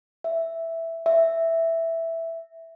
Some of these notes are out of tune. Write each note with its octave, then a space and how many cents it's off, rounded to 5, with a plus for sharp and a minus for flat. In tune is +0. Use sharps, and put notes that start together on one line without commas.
E5 +0
E5 +0